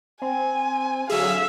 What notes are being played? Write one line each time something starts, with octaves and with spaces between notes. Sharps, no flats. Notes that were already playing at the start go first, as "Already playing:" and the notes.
C4 G#5
D3 F#3 G#4 E5 F5